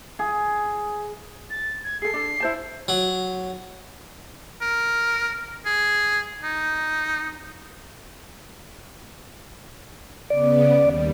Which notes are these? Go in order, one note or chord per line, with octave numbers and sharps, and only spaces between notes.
G#4
A6
G#6
G#4 A4 C7
D4 A4
E4 C5 A5
F#3
A#4
G#4
D#4
C#3 B3 D5
D#2 G3